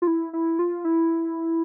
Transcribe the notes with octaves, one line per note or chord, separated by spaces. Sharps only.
F4
E4
E4
F4
E4